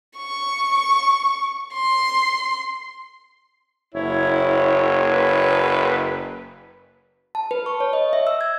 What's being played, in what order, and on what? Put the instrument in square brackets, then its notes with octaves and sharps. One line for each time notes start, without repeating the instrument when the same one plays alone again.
[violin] C#6
C6
[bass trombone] F#1 [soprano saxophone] E4 [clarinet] C#5
[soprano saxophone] B4
[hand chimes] A5
B4
C#6
C#5
D#5
E5
E6
G#6